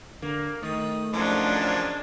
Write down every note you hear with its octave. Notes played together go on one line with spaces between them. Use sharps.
D3 A#3
D#3 A3 D#6
G#2 F3 F#3 C#4 D4 A#4